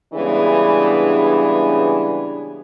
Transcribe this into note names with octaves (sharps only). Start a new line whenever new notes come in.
C#3 E3 G3 G#3 B3 D4